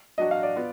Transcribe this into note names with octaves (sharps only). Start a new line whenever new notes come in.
F#3 D4 F#4 D#5
F5
D5
B3 F4